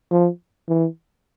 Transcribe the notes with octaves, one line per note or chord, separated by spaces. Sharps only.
F3
E3